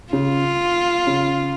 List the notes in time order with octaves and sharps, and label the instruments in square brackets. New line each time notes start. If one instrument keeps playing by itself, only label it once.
[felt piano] C#3 [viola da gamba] F4
[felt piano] C#3